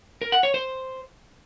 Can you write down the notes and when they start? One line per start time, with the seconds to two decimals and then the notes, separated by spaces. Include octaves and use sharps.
0.22 A#4
0.32 F#5
0.43 C#5
0.54 C5